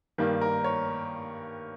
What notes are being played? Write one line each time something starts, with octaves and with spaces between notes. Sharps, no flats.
G2 D#3 G3 A#3
A#4
C#5